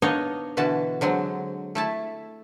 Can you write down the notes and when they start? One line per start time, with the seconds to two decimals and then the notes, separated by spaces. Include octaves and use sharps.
0.02 B3 D4 D#4 C#5 D#5 F5
0.57 B2 D3 E3 F#4 A5
1.01 D3 F#3 G#3 C4
1.75 A3 E4 A5